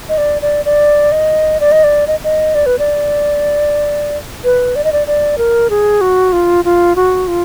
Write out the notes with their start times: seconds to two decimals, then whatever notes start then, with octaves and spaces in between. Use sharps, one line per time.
0.09 D#5
0.18 D5
0.42 D5
0.65 D5
1.12 D#5
1.60 D5
1.72 D#5
1.84 D5
2.07 D#5
2.24 D#5
2.55 D5
2.66 B4
2.79 D5
4.44 B4
4.76 D5
4.84 D#5
4.92 D5
5.07 D5
5.38 A#4
5.70 G#4
6.01 F#4
6.33 F4
6.65 F4
6.96 F#4
7.28 F4